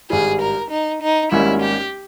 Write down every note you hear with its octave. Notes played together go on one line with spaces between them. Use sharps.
G#1 G2 G3 G#4
A#4
D#4
D#4
G#1 G#2 G3 A#3 C#4 E4
G4